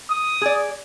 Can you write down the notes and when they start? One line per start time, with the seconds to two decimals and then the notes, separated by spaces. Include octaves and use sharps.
0.10 D#6
0.41 G#4 D5